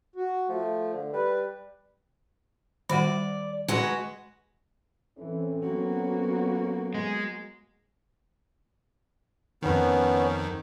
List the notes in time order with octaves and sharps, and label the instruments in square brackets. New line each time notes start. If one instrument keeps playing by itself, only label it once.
[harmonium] F#4
[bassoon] F3 [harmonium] A3
[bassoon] D3
[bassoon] G3 [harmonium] B4
[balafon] D#3 G3 F#5 [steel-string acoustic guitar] D5
[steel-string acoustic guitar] G#3 F#4 B4
[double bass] E3 [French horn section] C4 C#4 A4
[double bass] F#3 B3 [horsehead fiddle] A#3 F#4
[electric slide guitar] G#3
[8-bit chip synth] F2 D#3 [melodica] B3 C#4